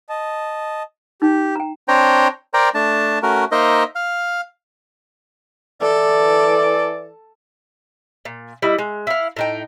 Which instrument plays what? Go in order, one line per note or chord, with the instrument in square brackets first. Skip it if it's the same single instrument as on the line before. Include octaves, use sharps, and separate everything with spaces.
[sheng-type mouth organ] D#5 A5
[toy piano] D#4 [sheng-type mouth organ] G4
[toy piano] G5 A#5
[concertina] C4 D4 C5 C#5 G5 A#5
A#4 C5 D5 G5 A#5
A3 D4 A5
A3 C#4 F#4 A#4
A#3 D#4 A#4 C5 D#5 E5
F5
[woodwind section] E3 D5 [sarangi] A4
[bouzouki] A#2
G3 E4 D#5
G#3
E4 F5
A2 D#4 G5